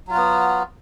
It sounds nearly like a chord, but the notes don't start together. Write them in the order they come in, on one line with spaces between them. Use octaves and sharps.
F#3 F4 F#4 B3